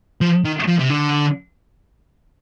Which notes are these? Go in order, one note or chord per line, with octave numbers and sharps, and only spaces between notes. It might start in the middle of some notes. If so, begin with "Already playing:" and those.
F3
D#3
F3
C3
D3